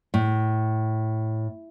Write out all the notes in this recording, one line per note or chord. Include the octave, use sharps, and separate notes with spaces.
A2